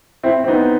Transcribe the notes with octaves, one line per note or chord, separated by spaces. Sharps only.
C4 E4
C4
B3 D#4